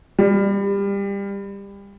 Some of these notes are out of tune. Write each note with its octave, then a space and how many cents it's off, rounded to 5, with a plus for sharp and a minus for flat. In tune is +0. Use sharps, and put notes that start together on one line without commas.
G3 +25